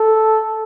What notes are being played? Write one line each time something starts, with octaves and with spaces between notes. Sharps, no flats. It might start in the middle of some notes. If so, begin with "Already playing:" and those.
Already playing: A4